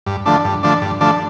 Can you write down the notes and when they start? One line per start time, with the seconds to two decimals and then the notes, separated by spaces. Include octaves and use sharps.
0.06 G2
0.26 D3 F3 A3 D4
0.45 G2
0.63 D3 F3 A3 D4
0.82 G2
1.00 D3 F3 A3 D4